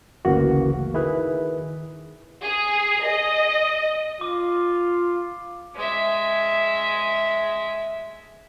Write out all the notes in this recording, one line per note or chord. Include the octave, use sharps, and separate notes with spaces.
G1 D2 C#3 E3 A#3 F#4
D#3 E4 G#4 B4
G#4
D#5
F4 D6
G#3 E5